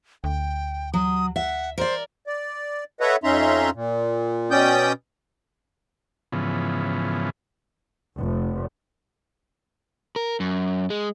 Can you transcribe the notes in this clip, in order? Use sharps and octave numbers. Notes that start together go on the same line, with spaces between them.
D2 G5
F#3 D#6
E5 F#5
A#4 C5 D5
D5
A4 B4 C#5 D#5 E5 F#5
F2 C#4 D#4 E5 A#5 C6
A#2
B2 C#4 D5 G5 D#6 G6
G#2 C#3 E3 F3 B3
F1
A#4
F#2
G#3